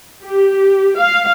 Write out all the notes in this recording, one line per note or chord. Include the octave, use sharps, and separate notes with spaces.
G4
F5